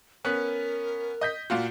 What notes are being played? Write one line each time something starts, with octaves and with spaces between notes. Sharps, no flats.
B3 C#4 A#4 F#6
D#5 G6 B6
A#2 F4 F#4